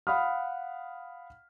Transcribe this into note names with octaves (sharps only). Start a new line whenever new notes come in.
F5 F#5 B5 D#6 F6